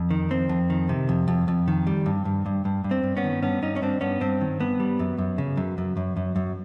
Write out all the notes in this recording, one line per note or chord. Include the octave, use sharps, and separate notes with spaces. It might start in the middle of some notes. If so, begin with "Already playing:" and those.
Already playing: F2
D#3
F2 C4
F2
D#3
C3
F2
F2
F2
D#3
G3
G2
G2
G2
G2
G2
C4
G2
B3 C#4
D#3
G2 B3 C#4
G2 C#4 D#4
C#4
G2 C4 D4
G2 B3 C#4
G2 C4
D#3
G2 B3
G3
F#2
F#2
C#3
F#2
F#2
F#2
F#2
F#2